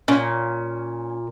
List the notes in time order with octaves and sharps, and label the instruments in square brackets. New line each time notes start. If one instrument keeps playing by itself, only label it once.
[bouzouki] A#2 [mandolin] C#4